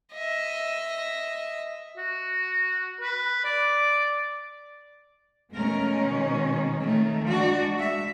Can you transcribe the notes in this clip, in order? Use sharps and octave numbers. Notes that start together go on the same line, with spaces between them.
D#5 E5
F#4
B4
D5
B2 G#3 A3 C#4 A#4
D#3
D#3 A3
G#3 D4 F#4
E5